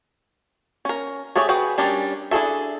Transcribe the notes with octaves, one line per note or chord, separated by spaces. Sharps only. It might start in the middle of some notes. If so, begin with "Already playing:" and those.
C#4 A#4
A3 G4 G#4 C#5
F#4 G#4 B4 F#5 G5
G3 C#4 D4 G4 A#4
D4 E4 G#4 A4 E5